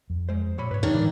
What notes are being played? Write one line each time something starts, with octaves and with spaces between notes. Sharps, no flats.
F2
G#3 C5
A#2 C#5 B5
G#2 B4 C#5
F#2 D#3 D4 C#5
A2 D3 E3 G#3